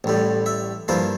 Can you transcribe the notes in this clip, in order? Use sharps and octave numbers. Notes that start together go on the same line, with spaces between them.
A1 A2 G3
E5
G2 F3 A#3 E4 F5